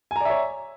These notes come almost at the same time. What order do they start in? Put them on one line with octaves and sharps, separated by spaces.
G#5 A#5 D5 E5 C#5